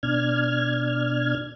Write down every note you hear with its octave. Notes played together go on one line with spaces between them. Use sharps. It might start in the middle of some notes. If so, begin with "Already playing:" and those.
B2 D4 F6 G#6